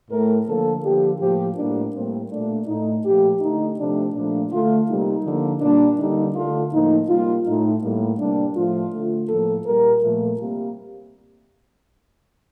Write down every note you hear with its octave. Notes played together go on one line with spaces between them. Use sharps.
A2 A3 A#4
D3 F3 A#3 A4
D3 F3 A#3 G4
A2 F3 A#3 G4
A2 G3 A#3 D4
A2 G3 A#3 C4
A#2 A3 D4
A2 A3 D#4
A#2 F3 A3 G4
D3 A3 D#4
C3 F3 A3 D4
A#2 F3 A3 D4
D3 A3 F4
C3 G3 A#3 D#4
D3 F3 A#3
A#2 G3 A#3 D4
D3 G3 A#3 D#4
D3 A3 F4
A2 F3 A#3 D#4
C3 G3 A#3 F4
A2 A3 D#4
A2 G3 A#3
C3 G3 A#3 D4
A2 F3 A3 F4
D3 A3
A2 F3 A#3 A4
A#2 G3 A#3 A#4
A#2 F3 A3
C3 G3 A#3